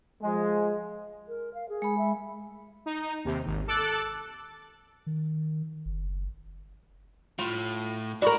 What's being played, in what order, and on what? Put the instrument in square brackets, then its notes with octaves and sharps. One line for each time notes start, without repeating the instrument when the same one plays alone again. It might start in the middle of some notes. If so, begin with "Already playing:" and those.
[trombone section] F3 G#3
[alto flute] A#4
F5
G#4
[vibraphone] G#3 B5
[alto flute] E5
[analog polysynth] D#4
D#2 C3
G#1
A4 D6 F#6 A6
[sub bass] D#3
F#1
[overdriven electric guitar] A2 [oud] F4
[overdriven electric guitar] E4 B5 [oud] F#4 A#4 [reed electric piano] D5 C#6